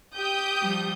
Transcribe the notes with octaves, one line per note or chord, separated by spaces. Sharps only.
G4 D#6 G6
F3 G3